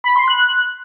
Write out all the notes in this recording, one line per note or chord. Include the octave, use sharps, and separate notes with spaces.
B5
C6
F#6